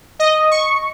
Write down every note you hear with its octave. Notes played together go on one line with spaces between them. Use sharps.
D#5
C#6